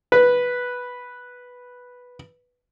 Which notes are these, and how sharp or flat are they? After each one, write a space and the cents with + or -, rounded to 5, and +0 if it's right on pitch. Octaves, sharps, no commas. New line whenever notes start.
B4 -5